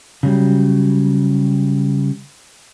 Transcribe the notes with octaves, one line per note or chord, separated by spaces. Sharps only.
C#3 F#3 G3